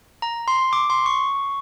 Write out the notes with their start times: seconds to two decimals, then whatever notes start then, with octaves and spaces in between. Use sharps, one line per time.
0.22 A#5
0.48 C6
0.73 D6
0.90 C6
1.06 C#6